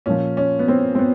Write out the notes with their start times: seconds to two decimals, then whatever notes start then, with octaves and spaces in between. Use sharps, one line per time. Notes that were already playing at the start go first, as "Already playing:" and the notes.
0.06 A#2 F3 C#4
0.37 C#4
0.59 B3
0.68 C4
0.95 C4
0.99 B3